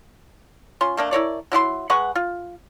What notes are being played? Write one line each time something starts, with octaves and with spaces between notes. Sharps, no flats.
C#4 F4 C6
A3 A#3 D4
E4 A#4 C#5 D5
F#3 E4 G#4 C6
G#3 B4 F#5 C#6
F4